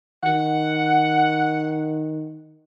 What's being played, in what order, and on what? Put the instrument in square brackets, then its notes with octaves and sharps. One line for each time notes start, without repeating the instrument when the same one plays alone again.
[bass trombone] D#3 [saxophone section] F#5